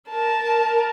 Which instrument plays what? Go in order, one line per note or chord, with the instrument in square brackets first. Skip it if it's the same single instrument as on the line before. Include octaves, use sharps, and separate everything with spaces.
[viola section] A#4 [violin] A5